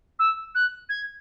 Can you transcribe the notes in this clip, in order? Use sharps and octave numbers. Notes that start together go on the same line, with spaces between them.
E6
F#6
G#6